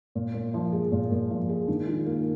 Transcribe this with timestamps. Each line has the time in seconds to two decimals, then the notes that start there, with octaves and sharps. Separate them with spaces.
0.15 A#2
0.34 A#2
0.54 F3
0.72 G#3
0.92 A#2
1.11 A#2
1.31 F3
1.49 G#3
1.68 D#3
1.87 F4
2.06 A#3